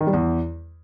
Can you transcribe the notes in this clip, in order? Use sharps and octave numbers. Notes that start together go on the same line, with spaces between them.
D#3
G3
E2